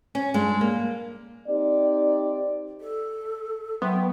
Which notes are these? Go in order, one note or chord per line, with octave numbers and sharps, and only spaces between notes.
C#4
G2 G#3
A#3
C4 D#4 G4 D5
A4
F#3 B3 G5 C6 C#6